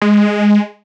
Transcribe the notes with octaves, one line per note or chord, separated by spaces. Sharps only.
G#3